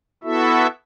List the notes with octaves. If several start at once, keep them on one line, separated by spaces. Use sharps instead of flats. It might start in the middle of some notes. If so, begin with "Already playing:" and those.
B3 E4 F#4 A4 E5